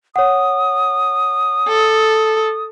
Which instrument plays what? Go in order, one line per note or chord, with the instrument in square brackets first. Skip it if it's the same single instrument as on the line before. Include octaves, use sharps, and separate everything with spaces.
[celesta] C#5 F#5 [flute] D#6
[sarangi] A4